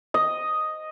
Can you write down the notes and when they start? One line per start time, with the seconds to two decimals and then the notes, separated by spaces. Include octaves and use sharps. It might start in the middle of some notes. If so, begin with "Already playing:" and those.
0.14 D#5